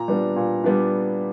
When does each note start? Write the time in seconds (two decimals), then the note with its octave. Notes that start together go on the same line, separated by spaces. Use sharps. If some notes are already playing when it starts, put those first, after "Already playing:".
Already playing: A#2 A#5
0.08 G3 B3 D4
0.36 A#2
0.64 G3 B3 D4